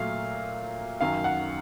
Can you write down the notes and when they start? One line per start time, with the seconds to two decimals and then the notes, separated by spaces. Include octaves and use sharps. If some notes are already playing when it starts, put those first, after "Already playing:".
Already playing: A#2 F#3 A3 F5
1.01 F#2 D#3 F#3 F5
1.24 F#5